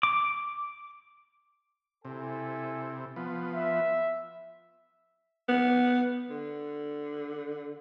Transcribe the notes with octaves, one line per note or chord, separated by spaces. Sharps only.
D6
C3 E4 A4 G#5
F3 B3
E5
B3
D3